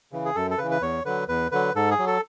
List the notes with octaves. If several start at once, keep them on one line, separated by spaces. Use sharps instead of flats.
C#3 E3
G#4
F#2 A4
A4
C#3 E3 B4
B4
E2 C#5
D3 F#3 B4
E2 B4
D3 F#3 B4
G#2 A4
G#4
F#3
A4